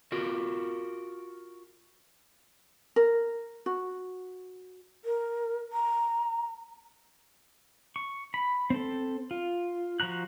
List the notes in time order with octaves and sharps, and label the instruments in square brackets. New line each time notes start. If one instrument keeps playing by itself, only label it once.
[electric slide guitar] F4 F#4 A#4
[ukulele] A#4
F#4
[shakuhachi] A#4
A#5
[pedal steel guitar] C#6
B5
C4 A4
F4
F3 F#4 A#5 F#6